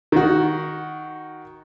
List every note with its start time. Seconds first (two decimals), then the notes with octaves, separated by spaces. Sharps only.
0.12 D#3 F#4